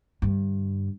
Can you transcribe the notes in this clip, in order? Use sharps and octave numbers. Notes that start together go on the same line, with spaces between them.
G2 D3